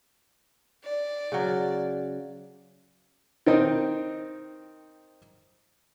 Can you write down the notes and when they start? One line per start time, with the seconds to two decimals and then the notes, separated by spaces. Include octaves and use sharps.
0.85 D5
1.32 C#3 F#3
3.46 D#3 C4 D#4